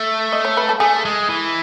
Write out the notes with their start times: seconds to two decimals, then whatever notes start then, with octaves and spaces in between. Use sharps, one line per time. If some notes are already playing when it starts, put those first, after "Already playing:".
Already playing: A3
0.33 D#5
0.45 C#5
0.57 B4
0.69 A4
0.80 A3 G#4
1.05 G#3
1.29 E3